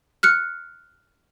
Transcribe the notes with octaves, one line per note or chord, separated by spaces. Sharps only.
F6 F#6 C#7